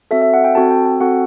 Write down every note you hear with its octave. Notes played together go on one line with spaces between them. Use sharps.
C4 F#4 A4 E5
E5
F#5
G5
C4 F#4 A4 A5
G5
G5
C4 F#4 A4 F#5